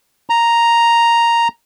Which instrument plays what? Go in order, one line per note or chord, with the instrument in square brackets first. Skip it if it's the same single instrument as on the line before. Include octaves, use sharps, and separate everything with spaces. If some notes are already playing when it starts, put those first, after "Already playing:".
[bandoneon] A#5